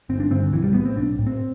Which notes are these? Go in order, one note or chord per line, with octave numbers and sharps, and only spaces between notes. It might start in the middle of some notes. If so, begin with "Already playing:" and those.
G1 C4
D4
G2 D3 C4
D3
B1 E3
G3
A2 B3
C4
B1 D4
A2
C4